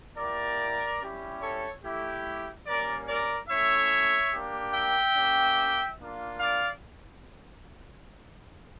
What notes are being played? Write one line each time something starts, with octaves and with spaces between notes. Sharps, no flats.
A#3 E4 G4 A#4 D5
G3 C#4 E4 G4
A4 C#5
A3 E4 G4
G3 A#3 C#4 A#4 D5
A#4 D5
A3 C#4 E4 C#5 E5
A#3 D4 G4
E5 G5
A#3 C#4 G4
A#3 D4 F4
D5 F5